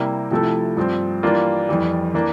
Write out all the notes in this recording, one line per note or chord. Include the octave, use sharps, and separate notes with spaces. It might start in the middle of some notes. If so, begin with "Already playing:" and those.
Already playing: C3 G3 A#3 E4
C3 F3 A3 E4 A4
G2 F3 C4
E3 G3 A#3 D4 F4
F2 E3 G3
E3 A#3 D4